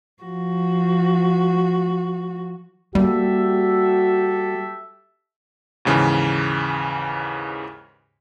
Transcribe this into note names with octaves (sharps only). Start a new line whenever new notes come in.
F3 F#4
G3 A#3 F#4 G4 A4 E5
D#2 G#2 C#3 E3